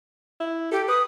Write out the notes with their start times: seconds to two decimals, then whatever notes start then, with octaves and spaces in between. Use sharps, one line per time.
0.40 E4
0.72 G4 A4
0.88 B4 D#6